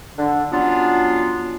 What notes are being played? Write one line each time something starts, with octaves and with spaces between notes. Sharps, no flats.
D3 D4
F#3 G3 B3 C#4 D4 F4